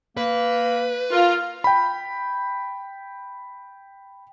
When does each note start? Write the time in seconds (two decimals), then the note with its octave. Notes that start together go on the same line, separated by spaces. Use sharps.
0.17 A#3 B4
1.12 F4 A#4
1.64 G5 B5